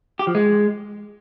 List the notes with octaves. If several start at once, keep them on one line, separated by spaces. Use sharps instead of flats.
G4
F3
G#3